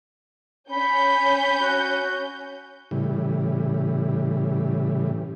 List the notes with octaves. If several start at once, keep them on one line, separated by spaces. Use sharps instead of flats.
C#4 B5 G6
F#4
A2 C#3 E3 G3